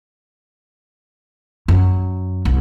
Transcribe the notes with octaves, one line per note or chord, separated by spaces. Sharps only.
F#2
C2